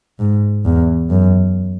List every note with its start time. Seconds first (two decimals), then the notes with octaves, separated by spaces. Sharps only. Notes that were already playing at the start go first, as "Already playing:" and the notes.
0.19 G#2
0.65 E2
1.10 F#2